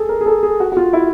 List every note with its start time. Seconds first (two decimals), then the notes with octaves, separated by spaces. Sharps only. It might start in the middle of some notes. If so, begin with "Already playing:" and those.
Already playing: G#4 A4
0.09 A#4
0.21 G#4
0.26 A4
0.43 G#4
0.60 F#4
0.72 F#4
0.77 F4
0.93 E4